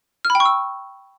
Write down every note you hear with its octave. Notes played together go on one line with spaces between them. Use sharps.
F6
B5
G5
C#6
E6